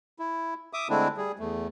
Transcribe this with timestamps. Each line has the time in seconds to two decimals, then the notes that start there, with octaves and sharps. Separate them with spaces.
0.19 E4
0.73 E5 D6 D#6
0.89 D3 G#3 A3 C4 D4 E4
1.17 G3 G#4
1.39 E2 A3